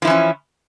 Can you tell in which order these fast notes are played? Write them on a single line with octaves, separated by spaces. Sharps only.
F3 E4 E3 C#4